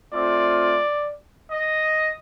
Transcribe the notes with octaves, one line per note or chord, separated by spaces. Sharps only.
A3 C4 F4 D5
D#5